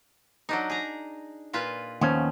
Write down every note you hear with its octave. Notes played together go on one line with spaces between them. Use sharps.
F#3 D4 D#4
G#4 A#5
A#2 F4 B4
D#2 F3 B3 C#4